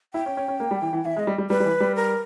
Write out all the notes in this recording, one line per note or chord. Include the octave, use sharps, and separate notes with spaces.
E4 G5
C#4
C#4
C#4
A#3
G3
E3
E3
E3 E5
G#3
D#5
G3
G3
G3 B4
G3
E3
G3
A#4